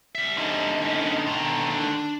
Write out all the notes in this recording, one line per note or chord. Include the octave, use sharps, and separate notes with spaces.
G3 E5
D3 D#4
B3 C#4
B2 D3 D#3 A#5
D4